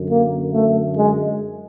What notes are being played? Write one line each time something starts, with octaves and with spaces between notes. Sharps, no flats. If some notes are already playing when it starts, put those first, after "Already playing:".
Already playing: F#2 D3
A#3
A3
G#3